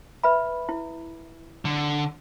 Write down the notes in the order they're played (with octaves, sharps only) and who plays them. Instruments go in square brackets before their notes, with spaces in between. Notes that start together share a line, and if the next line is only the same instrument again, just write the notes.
[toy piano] B4 E5 B5
E4
[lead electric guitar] D3